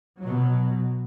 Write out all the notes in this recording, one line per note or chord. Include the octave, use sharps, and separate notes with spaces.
B2 F#3